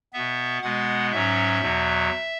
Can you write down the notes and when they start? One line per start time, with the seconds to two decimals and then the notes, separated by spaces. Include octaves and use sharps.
0.13 B2 B3 E5
0.62 B2 G#3 B3 F#5
1.12 G#2 F#3 C#4 E5
1.61 E2 B2 F#3